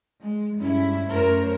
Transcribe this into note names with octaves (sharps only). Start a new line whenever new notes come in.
G#3
G2 G#3 C#4 E4
F#2 A3 A#4 C5 C#5